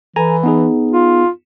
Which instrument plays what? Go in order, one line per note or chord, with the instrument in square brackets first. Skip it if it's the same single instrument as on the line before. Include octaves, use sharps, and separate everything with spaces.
[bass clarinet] E3 [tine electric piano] A4 G#5 A#5
[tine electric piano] B3 D#4 G#4
[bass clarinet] F4